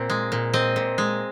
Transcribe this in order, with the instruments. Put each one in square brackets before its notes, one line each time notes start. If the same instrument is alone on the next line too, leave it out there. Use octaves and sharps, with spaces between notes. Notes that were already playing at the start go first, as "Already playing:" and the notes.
Already playing: [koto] A#2 C4
G#3
A#2
C4 D#5
A#2
G#3